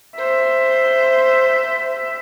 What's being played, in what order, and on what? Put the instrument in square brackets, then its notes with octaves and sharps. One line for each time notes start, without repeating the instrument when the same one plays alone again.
[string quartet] C5 [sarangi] E5